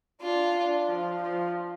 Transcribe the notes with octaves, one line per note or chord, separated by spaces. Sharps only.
D4 F4
D4
F3
F3